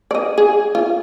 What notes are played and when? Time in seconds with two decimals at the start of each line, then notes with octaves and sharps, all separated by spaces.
0.11 D5 D#5
0.38 G#4
0.75 F4